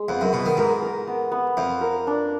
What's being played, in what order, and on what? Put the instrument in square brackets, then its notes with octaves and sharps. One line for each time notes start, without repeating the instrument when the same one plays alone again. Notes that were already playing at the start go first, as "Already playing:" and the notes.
Already playing: [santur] G#3
[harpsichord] F2 [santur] B3
[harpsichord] F#2
[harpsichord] B2 [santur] B3
[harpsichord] D#3
[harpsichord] G#2 [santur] A#4
[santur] A#4
B3
B3
[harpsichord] F2 [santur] F5
[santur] A#4
D4